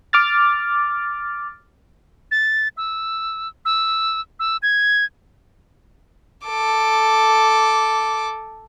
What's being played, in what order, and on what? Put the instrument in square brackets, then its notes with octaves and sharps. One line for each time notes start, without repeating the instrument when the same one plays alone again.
[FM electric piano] D6 F6 A6
[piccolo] A6
E6
E6
E6
G#6
[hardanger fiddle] A4 D6